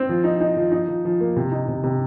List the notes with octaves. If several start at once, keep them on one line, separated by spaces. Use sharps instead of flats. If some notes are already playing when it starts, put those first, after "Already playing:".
Already playing: C4
F3
D#4
D#4
F3
D#4
F3
F3
A#3
C3
D#4
C3
C3